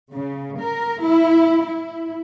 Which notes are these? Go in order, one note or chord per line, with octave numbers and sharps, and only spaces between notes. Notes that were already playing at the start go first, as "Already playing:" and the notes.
C#3
A#4
E4
E4